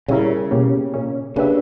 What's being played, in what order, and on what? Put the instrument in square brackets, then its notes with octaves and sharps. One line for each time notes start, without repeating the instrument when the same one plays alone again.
[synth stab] A#2 G3 C#4 E4 A#4 [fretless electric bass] C#3
[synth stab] B2 A#3 C#4 G4
A#2 A#3 C#4
[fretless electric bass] C#3 [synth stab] A#3 D4 G4 B4 E5